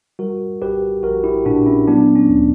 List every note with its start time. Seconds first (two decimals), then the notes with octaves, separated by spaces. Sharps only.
0.19 G3 F#4 A#4
0.62 A#1 G4 B4
1.03 A#1 F#4 A#4
1.24 E4 G4
1.45 A#2 D4 F#4
1.66 C#4 E4
1.87 F#3 B3 D4
2.15 C#4
2.29 D2